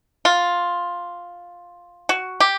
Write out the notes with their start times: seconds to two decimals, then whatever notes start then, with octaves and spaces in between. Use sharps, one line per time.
0.25 F4
2.09 F#4
2.40 G4